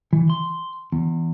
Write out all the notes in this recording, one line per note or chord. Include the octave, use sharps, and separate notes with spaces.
E3
C6
E2